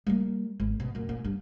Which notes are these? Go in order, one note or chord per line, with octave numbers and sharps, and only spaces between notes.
G3 A#3
G#1
B2
F#2 A#2
A#2
G2